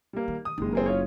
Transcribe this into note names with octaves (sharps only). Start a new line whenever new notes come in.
G3 A#3
D#3
D#6
F#1 D#3 G#3 A#3
C4 G#4 A#4
C#4 F4 C#5